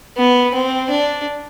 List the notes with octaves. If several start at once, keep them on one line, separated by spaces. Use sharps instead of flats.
B3
C4
D4